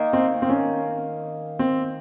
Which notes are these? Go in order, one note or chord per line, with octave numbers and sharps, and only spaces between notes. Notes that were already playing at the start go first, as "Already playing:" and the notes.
Already playing: D#3 A#3
C4
C4
C#4
C4